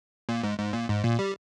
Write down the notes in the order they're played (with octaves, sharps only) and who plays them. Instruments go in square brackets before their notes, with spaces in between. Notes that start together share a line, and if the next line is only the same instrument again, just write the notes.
[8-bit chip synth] A#2
G#2
G#2
A#2
G#2
A#2
G3